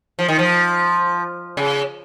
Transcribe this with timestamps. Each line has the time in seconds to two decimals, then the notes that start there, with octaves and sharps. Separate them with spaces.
0.19 F3
0.28 D#3
0.39 F3
1.57 C#3